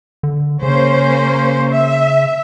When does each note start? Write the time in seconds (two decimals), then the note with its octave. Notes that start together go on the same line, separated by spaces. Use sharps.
0.23 D3
0.63 C#3 A#3 C#4 C5
1.71 E5